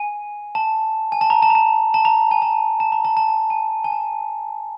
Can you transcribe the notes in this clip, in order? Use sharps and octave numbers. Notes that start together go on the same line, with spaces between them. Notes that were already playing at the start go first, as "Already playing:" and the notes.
Already playing: G#5
A5
G#5
A5
A#5
A5
A#5
A5
A5
A#5
G#5
A5
A5
A#5
A5
A5
G#5
G#5
G#5
A5